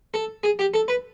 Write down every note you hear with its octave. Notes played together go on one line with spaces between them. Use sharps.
A4
G#4
G4
A4
B4